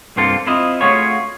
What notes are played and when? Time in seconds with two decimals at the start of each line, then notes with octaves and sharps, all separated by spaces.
0.16 C2 G2 A#3 C4 F4 A4
0.47 C4 E4 F4 D#5
0.81 A3 C#4 F4 F#4 G#4 C#5